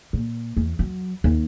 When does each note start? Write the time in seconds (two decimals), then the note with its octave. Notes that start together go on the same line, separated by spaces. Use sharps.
0.13 A#2
0.57 E2
0.79 F#3
1.24 D#2